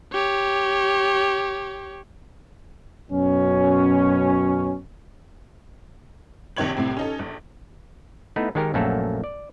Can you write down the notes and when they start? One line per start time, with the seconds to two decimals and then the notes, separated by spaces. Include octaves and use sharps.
0.13 G4 C#5
3.11 F#2 B2 C#4
6.57 A#1 C3 D#3 C#5 G#6 F#7
6.77 C2 A2 C3 C4
6.97 C#4 D#4 A4
7.19 A#1
8.36 A3 B3 D#4 E4 B4
8.55 D#3 G#3 D#4 G4 A#4
8.74 A#1 F#2 F#3 A3 A#3 A4
9.24 D5